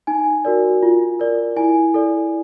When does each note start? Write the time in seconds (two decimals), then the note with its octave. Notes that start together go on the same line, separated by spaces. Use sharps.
0.07 D#4 G#5
0.45 F#4 A#4 D5
0.83 F4
1.20 A#4 D5
1.57 E4 G#5
1.94 A4 D5